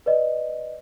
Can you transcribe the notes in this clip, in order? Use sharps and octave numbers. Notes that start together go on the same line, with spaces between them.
B4 D5 D#5